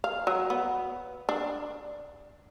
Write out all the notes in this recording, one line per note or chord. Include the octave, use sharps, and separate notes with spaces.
F5
F#3
B3
D4